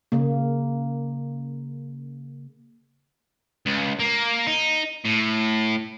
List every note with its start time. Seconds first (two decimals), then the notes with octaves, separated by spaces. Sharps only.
0.12 C#3 A#3
3.66 C#2
3.99 A#3
4.47 D#4
5.05 A2